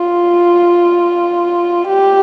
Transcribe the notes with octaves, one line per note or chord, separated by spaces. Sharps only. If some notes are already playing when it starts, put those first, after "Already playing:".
Already playing: F4
G4